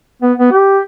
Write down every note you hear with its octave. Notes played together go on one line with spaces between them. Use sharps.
B3
B3
G4